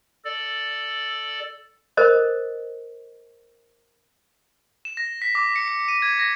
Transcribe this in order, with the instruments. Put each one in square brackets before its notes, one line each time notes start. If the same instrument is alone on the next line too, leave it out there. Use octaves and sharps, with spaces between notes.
[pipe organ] A4 D5
[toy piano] A4 A#4 C5 D#5
[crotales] E7
A#6
B6
D6
C#7
C#7
D#7
G#6
A#6